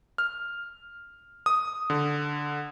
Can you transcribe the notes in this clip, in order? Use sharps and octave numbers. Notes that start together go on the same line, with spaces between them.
F6
D#6
D3